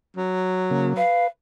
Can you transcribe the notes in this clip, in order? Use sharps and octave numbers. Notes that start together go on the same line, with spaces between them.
F#3
C#3 A#3
B4 F5